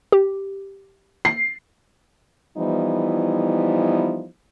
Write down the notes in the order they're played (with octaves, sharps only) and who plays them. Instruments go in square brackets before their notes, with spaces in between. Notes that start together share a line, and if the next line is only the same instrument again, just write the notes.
[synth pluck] G4
[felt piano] C7
[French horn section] E3 F3 G3 B3 D#4 E4